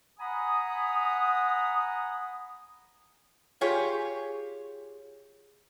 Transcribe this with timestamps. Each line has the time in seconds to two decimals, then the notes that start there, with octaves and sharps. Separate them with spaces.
0.19 F#5 G#5 A#5 B5 D#6
3.61 F4 G4 G#4 C#5